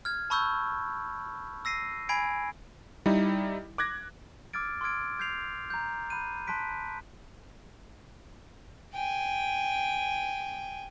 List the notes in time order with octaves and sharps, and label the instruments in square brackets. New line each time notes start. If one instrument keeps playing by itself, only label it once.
[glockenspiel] F6 G#6
A5 B5 C#6 E6 F#6 G6
E6 A#6 C7 D#7
G#5 B5 G#6 C7 D7
[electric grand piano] G3 D#4 E4
D6 F#6 G#6 A#6
[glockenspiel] D6 E6 F6 G#6 A6 D7
C6 D6 E6 F6 G#6 D7
G6 G#6 C7 F7
A#5 G6
B5 F#6 G6 D#7
A5 C6 F#6 B6 D7
[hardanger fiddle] G5 G#5